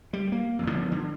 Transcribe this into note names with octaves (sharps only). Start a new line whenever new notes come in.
G3
A#3
G#1 F2
D3 F3 B3
D3